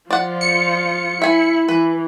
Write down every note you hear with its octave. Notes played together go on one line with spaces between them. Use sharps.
F3 F4 D5 F#5
C#7
E4 E5 G#5
E3 B4